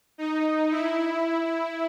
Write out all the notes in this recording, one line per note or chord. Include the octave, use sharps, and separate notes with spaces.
D#4
E4